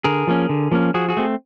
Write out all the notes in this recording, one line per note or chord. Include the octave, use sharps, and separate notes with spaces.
D3 G#4 A#4
F3 A#3 C#4
D3
F3 A#3 C#4
F3 F#4 G#4
F#4 G#4
A3 C4